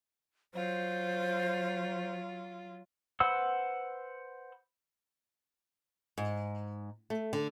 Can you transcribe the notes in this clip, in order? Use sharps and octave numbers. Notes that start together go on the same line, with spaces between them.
F#3 F4 C5
B4 C5 F#5 E6
G#2
A3
D3